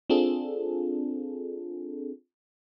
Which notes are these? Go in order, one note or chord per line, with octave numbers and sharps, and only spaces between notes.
C4 D4 F4 G#4 A4